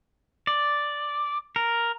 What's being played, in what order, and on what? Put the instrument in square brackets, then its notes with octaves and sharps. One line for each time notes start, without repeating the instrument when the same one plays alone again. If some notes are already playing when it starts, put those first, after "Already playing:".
[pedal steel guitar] D5
A#4